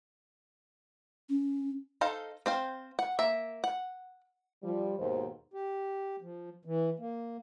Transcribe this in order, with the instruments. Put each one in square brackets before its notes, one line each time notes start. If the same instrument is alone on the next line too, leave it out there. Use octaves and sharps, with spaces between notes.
[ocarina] C#4
[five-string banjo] D#4 A4 C5 F5
C4 C5 F5
F#5
A#3 E5
F#5
[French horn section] F3 G3
D#2 G#2 B2 D#3 C5
[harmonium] G4
F3
E3
A#3